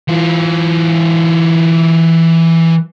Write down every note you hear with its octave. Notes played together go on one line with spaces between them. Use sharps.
E3 F4